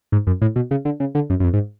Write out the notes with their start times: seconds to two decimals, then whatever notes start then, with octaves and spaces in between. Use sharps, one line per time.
0.12 G#2
0.27 F#2
0.42 A2
0.56 B2
0.71 C#3
0.85 D3
1.00 C#3
1.15 D3
1.30 F#2
1.40 F#2
1.44 F2
1.53 G#2